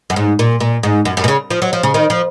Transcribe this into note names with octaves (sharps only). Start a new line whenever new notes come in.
F#2
G#2
A#2
A#2
G#2
F#2
F#2
B2
C#3
F3
F#3
F3
C#3
D#3
F3